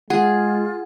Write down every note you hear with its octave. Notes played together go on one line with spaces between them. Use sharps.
G#3 F4 G#4 F#5